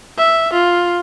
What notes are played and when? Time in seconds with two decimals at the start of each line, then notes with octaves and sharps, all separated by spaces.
0.18 E5
0.53 F4